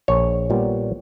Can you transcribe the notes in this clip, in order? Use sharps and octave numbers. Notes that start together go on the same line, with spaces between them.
A#1 C#5
A#2 G3 B3